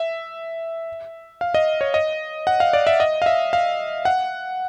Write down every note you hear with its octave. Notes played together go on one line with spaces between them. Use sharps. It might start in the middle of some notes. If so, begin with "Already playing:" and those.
Already playing: E5
F5
D#5
C#5
D#5
F#5
F5
D5
E5
D#5
F5
E5
F5
F#5